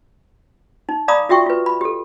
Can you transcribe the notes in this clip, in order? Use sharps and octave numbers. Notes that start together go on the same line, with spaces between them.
D#4
D5 F5 A#5 B5 D6 D#6
F4 F#4 E5 G5 C#6
F4 B4
B5
G4 A4